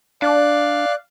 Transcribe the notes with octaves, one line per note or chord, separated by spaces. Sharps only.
D4 D5 F5 F#6